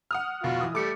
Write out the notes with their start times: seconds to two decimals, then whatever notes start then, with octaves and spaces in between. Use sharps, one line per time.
0.11 F#5 D#6 F6
0.43 F1 B2 F4 F#4
0.61 E3 D#6
0.75 G3 A3 D6 C#7